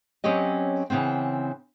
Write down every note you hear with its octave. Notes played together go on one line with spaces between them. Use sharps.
F#3 C4 C#4 G4 D#5
C#3 E3 B3 C4